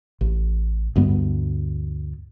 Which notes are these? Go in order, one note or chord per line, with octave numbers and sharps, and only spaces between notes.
A1
D2 G2 G3 B3